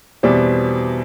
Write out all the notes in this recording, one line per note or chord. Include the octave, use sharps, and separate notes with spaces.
E2 B2 G3 C4 D5